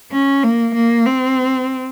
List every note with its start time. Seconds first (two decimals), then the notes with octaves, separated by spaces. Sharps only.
0.11 C#4
0.43 A#3
0.74 A#3
1.06 C4